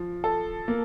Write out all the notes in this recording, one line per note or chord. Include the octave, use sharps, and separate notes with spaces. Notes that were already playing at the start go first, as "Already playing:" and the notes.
Already playing: F3
A4
A#3